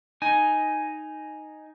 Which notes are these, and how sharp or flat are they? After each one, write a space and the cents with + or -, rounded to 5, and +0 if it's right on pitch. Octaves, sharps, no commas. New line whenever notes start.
D#4 +0 G#5 +0